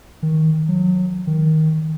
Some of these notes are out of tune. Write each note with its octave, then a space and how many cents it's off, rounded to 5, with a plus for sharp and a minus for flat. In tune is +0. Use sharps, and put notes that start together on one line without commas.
D#3 +20
F#3 -25
D#3 +10